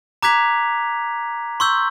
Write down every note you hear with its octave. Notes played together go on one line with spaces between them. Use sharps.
A#5 D6 F#6 G#6 B6 F7
C6 C#6 E6 G6